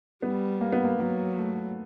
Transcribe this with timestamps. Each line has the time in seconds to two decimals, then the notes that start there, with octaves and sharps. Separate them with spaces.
0.22 G3 B3
0.61 A#3
0.72 B3
0.84 A#3
0.99 F#3 A#3
1.38 A3